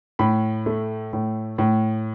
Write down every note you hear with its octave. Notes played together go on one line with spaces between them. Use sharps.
A2 B5
A3
A2
A2